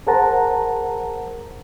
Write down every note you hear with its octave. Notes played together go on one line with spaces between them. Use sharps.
G#4 A#4 C5 F#5 A5 A#5